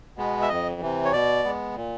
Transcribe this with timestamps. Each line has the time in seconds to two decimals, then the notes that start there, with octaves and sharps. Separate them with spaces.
0.18 B2 G#3 B3
0.42 E5
0.49 F2 D#5
0.81 C3 E3
1.05 C#5
1.12 B2 D5
1.44 G#3 B3
1.75 A#2